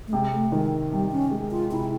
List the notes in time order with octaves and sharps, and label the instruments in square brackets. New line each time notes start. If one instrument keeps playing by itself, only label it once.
[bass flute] A3
[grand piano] C3 [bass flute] G#3
[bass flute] A3
[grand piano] D#3 [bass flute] G#3
[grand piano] C3 [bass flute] G3
[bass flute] C#4
[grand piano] G#3
[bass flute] F4
[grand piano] C3 [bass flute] E4